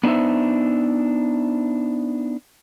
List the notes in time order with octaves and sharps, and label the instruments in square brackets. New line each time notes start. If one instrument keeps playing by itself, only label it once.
[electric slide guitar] B3 D4 D#4 C5 E5